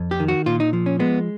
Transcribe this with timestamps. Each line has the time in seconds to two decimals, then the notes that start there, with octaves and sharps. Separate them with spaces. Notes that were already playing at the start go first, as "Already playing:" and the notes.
Already playing: F2
0.11 G4
0.20 D#3
0.28 F#4
0.46 A#2 F4
0.60 D#4
0.73 F3
0.86 C#4
1.00 G#3 B3